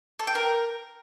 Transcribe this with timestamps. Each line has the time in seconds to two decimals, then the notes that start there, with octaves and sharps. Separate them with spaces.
0.19 A4
0.27 G5
0.35 A#4